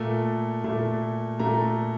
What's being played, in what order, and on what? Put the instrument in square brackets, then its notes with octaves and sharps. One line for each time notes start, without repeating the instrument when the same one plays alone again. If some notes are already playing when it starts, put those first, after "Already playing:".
Already playing: [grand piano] A#2 A3
A#2 A3
A#2 A3 A#5